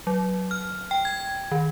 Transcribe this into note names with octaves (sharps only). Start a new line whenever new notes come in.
F#3
F6
G5
G#6
D#3